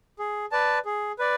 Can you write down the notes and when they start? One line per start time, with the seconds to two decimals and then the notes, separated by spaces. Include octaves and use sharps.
0.19 G#4
0.52 B4 D5 A5
0.85 G#4
1.19 B4 D5